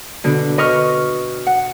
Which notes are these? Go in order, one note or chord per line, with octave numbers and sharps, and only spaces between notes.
B2 D3 D4
B4 D#5 C#6 F6
F#5